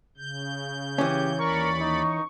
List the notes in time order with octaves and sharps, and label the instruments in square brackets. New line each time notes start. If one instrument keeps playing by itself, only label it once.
[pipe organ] C#3 G6
[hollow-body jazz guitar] E3 C#4 [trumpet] G4
[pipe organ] D#2 D5 B5 [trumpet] A#4 [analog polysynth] C#6
[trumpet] D#4